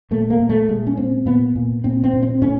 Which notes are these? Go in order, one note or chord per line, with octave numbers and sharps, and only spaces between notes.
A#2 A3
A#3
A#2
A3
A#2 G#3
C#4
A#2 C4
A#2 B3
A#2
A#2 C4
C4
A#2
C4
A2 C#4